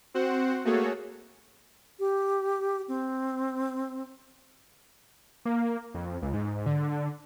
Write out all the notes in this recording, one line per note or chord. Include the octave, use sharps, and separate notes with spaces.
C4 F#4 C5 F#5
A3 A#3 F#4 G#4 A4 C#5
G4
C4
A#3
F2
C#2
G#2
D3